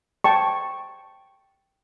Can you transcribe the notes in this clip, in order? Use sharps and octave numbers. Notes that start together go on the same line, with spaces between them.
G5 A5 C#6